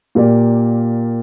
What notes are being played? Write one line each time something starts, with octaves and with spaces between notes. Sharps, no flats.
A#2 A#3 G4 A#4 D5